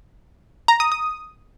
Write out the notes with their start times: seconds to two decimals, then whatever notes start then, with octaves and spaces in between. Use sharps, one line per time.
0.68 A#5
0.80 D#6
0.92 D#6